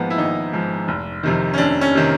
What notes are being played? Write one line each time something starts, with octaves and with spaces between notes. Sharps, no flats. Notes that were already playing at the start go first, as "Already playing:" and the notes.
Already playing: G#1 G#2 F3 A#3 B3
E4
G#1 D#4
G#2 F3
F1
F2 C3 D#3
C#4
F1 D4
C#4
C3 D#3